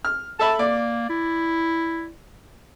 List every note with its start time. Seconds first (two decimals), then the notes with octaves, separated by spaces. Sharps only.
0.05 F6
0.39 A4 E5 A5 B5
0.59 A#3 D5
1.10 E4